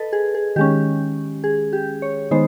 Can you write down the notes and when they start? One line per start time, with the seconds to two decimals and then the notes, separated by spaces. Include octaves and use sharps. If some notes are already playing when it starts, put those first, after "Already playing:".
Already playing: A4 B4 D#5
0.13 G#4
0.34 G#4
0.56 D#3 G#3 C#4 G4
1.44 G#4
1.73 G4
2.02 C#5
2.31 D#3 G#3 B3 D#4 C5